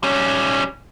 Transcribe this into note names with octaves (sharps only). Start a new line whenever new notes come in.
G3 C#4